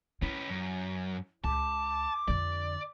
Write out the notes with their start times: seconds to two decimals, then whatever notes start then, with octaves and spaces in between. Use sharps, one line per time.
0.22 C#4 E4 B4
0.50 F#2
1.44 C#2 A5 D6
2.28 F2 D3 D5